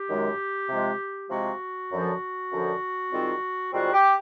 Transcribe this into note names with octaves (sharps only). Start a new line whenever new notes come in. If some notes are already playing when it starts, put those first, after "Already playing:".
Already playing: G4
F#2 D#3 G#3
C3 F3 G#3
C3 F3 G#3 F#4
F#2 D3 F3
F#2 D3 F3
G#2 D#3 G3 C4 F4
G#2 D#3 G3 C4 F4 F#4
G4